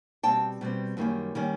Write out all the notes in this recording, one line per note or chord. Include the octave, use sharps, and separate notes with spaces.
B2 G3 C4 G5 A5
B2 G3 C4
F#2 D#3 G3 A#3 C#4
D#3 G3 A#3 C#4